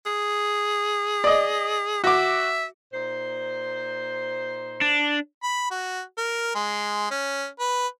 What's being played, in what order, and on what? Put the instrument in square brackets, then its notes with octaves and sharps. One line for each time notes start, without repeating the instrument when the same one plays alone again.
[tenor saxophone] G#4
[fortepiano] D5 D#5
[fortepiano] F#4 D6 [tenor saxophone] E5
[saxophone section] A#2 D#4 C5
[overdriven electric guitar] D4
[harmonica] B5
F#4
A#4
G#3
C#4
B4